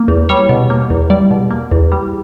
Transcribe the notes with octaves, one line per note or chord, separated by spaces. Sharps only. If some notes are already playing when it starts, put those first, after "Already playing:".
Already playing: A#3
E2
G3 C#5
B2
A#3
E2
G3 D5
B2
A#3
E2
G3